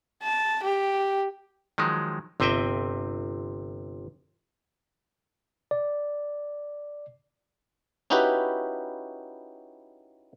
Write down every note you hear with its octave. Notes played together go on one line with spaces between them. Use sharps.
A5
G4
D#3 F3 F#3 G#3
G1 C3 C4 D#5 E5 G5
D5
C#4 D#4 E4 F#4 G4 B4